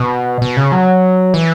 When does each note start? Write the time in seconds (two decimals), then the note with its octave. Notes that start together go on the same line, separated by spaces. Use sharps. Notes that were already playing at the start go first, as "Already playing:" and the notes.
Already playing: B2
0.42 B2
0.57 C#3
0.72 F#3
1.34 E3